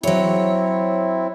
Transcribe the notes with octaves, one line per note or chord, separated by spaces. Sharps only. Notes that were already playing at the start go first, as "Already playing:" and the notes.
F#3 C4 E4 C#5